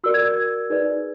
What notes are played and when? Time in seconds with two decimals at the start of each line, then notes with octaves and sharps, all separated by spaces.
0.04 F#4 A#4 D5 E6
0.14 G#6
0.25 G#6
0.70 D#4 G#4 B4 D5